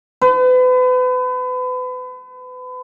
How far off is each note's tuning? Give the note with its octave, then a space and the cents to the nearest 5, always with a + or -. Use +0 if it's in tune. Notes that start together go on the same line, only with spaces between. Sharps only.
B4 +35